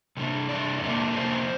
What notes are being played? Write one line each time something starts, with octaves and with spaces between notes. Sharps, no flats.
C3 G3 D4
C3 G3 D4 D5
F2 C3 F3 A#3 D4
F2 C3 F3 A#3 D4 C5